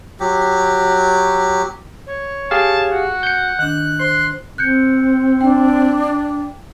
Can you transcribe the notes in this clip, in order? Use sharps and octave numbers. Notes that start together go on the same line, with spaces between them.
F#3 G4
C#5
G4 G#4 F5 A5
F#4 F#5
G6 C#7
D#3 D4 F#6
C5 C6
C4 F#6 G6 C#7
D4 G5